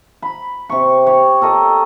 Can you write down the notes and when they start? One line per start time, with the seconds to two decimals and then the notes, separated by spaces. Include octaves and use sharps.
0.22 B5
0.69 C3 C#6
1.07 G4 C#5
1.42 A4 A#4 D#5 A5